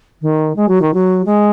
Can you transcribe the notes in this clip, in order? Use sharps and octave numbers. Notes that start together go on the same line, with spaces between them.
D#3
G#3
F#3
D#3
F#3
G#3